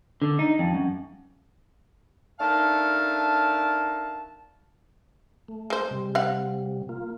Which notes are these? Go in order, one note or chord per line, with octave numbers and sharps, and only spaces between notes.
D3
D#4
F2
F#2
A3 D4 D#4 A#4 F5 A5
A3
G#3 C5
C3 G3
C4 F5 F#5
A#3 F4